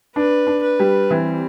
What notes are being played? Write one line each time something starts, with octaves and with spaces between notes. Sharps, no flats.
D4 B4
D4
B4
G3
E3 C4